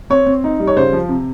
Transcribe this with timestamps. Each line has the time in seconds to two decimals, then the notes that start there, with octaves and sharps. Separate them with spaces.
0.10 C4 C#5
0.26 C4
0.44 D#4
0.60 G3
0.67 C#5
0.76 C#3 C5
0.93 F3
1.09 C3